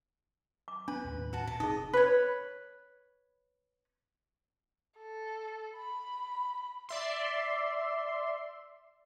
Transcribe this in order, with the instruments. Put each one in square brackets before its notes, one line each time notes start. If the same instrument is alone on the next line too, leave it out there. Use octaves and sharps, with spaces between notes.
[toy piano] D6
[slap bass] B3 C#4 [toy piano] D4 [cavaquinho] B4
[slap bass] D#2 A2
[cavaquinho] F#4 A5
[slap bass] A#2 [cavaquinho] A5
[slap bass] F1 [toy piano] D#4 G#4 [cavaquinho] D#5
[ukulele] B4 C#5
[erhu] A4
B5
[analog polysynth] D5 E5 C6